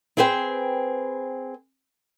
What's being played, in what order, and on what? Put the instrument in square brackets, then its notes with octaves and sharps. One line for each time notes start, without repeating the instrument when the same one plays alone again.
[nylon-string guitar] C4 E4 G#4 B4 C5 G5